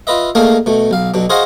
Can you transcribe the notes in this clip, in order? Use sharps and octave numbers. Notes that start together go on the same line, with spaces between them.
F4 B4 D#5 E5
A3 A#3 D4 D#4 G#4 F5
B2 A3
B1 F5
B1 B2 D4
F#4 G#4 C5 D#5 F5 F#5